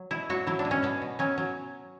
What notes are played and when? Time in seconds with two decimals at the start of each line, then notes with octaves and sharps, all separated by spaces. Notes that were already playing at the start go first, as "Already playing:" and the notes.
Already playing: F#3
0.11 B2 E4
0.30 F#3 F#4
0.47 F#3 E4
0.59 D4
0.65 B2
0.71 C#4
0.83 B2 B3
1.02 B2
1.19 F#3 C#4
1.38 F#3